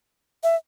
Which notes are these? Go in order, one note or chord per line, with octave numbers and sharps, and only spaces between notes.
E5